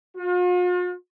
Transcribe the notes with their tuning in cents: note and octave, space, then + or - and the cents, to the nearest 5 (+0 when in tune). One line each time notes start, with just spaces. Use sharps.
F4 +45